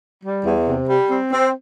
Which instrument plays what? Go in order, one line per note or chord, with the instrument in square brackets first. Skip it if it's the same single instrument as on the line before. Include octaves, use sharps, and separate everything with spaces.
[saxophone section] G3
E2
C3
G3
C4
C4